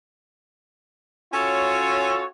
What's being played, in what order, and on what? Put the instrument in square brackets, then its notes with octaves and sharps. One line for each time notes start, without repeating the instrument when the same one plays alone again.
[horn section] C#4 F4 F#4 A4 C#5